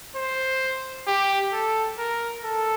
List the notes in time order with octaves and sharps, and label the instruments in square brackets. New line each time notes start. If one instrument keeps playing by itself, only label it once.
[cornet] C5
G4
A4
A#4
A4